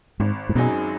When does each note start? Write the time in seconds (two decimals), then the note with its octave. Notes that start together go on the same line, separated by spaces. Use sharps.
0.19 G#1 G#2
0.49 G#2
0.55 F#2 B2 F#3 D#4 G#4